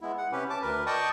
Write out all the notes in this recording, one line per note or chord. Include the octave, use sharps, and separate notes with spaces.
G#3 B3 E4
F#5
C3 C#4 G4 B4
A5 D6
D2 A#4 B4
D5 D#5 G5 A5 C#6 D#6